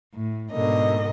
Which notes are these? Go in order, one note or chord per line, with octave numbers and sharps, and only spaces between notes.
A2
G#2 B2 D3 A#4 D#5